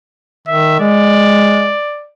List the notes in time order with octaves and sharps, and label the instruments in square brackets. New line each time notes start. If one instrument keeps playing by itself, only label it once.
[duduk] D#3 [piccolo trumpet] E5
[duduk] G#3 [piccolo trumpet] D5